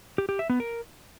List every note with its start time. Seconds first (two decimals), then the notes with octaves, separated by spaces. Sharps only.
0.18 G4
0.29 G4
0.39 E5
0.49 B3
0.60 A#4